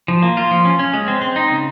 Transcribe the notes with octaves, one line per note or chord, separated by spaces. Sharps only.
F3
A#3
F4
F3
C#4
C#4
G#3
C4
C4
D#4
C#3